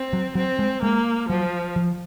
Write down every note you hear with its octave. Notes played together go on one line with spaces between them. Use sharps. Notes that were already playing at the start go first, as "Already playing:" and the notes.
Already playing: C4
F#3
F#3 C4
G#3
G#3 A#3
F3 F#3
F3